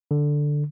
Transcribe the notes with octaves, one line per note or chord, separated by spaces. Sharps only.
D3